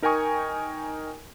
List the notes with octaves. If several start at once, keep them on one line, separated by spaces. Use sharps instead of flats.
D#4 A#4 G5 G#5 C#6 D#6